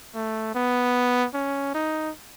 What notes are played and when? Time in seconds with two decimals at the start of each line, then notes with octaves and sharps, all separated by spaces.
0.15 A3
0.55 B3
1.34 C#4
1.74 D#4